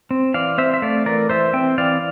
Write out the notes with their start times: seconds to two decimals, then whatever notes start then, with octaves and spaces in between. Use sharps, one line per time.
0.11 C4
0.34 E3 D5 F5
0.58 C4 C5 E5
0.74 E5
0.82 A3 D5 F5
1.06 E3 A#4 D5
1.30 E3 C5 E5
1.53 C4 E5 G5
1.78 E3 D5 F5